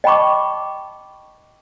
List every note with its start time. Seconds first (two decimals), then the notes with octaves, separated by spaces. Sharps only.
0.04 D#5 G5 A5 B5 C#6 D6